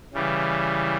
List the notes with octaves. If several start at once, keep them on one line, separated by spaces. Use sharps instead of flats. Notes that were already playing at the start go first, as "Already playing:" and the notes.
C#3 E3 G3